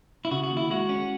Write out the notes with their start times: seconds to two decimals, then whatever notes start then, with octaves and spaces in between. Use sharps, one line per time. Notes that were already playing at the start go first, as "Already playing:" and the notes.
0.25 E4
0.31 C#3 F#4
0.43 F#4
0.51 D#2
0.57 E4
0.70 G#3 F#4
0.89 C#4